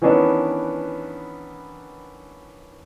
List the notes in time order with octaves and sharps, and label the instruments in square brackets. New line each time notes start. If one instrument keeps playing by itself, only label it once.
[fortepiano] D#3 E3 B3 C#4 D4